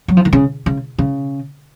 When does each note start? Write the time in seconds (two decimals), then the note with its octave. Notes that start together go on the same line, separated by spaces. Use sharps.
0.08 F#3
0.17 F3
0.25 D#3
0.33 C#3
0.66 C#3
0.98 C#3